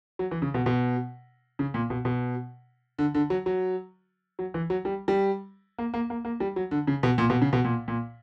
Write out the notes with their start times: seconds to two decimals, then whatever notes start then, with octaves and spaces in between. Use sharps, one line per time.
0.19 F#3
0.31 E3
0.42 C#3
0.54 B2
0.66 B2
1.59 C#3
1.74 A#2
1.90 B2
2.05 B2
2.99 D3
3.14 D3
3.30 F#3
3.46 F#3
4.39 F#3
4.54 E3
4.70 F#3
4.85 G3
5.08 G3
5.78 A#3
5.94 A#3
6.10 A#3
6.25 A#3
6.40 G3
6.56 F#3
6.71 D3
6.87 C#3
7.03 B2
7.18 A#2
7.30 B2
7.42 C#3
7.53 B2
7.65 A#2
7.88 A#2